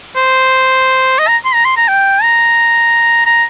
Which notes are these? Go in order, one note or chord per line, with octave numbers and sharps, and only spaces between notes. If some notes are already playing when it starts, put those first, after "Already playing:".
C5
D#5
A#5
C6
A#5
C6
A#5
G5
A#5
A#5